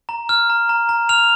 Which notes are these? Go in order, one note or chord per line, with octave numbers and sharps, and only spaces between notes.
A#5
F6
A#5
A#5
A#5
F6 F7